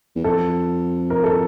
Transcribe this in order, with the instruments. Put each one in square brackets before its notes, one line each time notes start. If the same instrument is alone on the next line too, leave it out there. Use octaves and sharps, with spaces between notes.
[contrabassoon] E2
[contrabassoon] F2 [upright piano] A4
[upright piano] A#4
A4